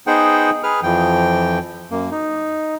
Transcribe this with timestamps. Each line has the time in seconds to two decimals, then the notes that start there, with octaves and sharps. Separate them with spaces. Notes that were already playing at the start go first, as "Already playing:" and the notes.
0.07 B3 D#4 G#4 C5 F#5 G5
0.63 G#4 B4 F6
0.83 F2 E3 F3 G5
1.91 F#2 A#3
2.11 D#4